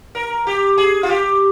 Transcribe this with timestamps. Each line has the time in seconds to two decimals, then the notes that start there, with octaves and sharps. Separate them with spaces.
0.15 A#4
0.47 G4
0.78 G#4
1.03 F4
1.09 G4